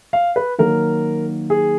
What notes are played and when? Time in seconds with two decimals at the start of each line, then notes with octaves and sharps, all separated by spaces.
0.13 F5
0.36 B4
0.59 D#3 F#3 A#3 A#4
1.50 G#4